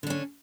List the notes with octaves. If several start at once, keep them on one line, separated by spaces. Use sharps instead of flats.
D3 C#4 D4